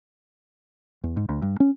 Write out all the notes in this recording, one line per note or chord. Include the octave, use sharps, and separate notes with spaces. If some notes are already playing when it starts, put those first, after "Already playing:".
E2
G#2
D2
G2
C#4